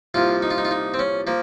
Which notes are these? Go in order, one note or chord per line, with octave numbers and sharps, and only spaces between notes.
C2 A#2 F3 F4
D#4
F4
D#4
F4
D#4
C4
C#4
F3 A#3